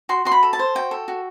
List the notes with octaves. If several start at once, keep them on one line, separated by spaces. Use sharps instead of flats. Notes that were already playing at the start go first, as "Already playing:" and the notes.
F#4 C6
F#4 C6
B5
A4
A5
C5
F#4 G5
A4
F#4